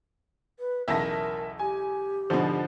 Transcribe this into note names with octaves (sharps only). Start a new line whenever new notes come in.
B4
B1 E2 C#3 A#4 E5 A5 A#6
G4 G#5
G#2 B2 D3 F3